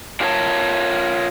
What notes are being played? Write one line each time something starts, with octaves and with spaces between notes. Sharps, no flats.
D4 F4 G4 A#4 C#5 A5